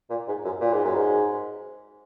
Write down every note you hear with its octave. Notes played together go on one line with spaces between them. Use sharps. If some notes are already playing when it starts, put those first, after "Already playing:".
A#2
G#2
F#2
A#2
G#2
F#2
G#2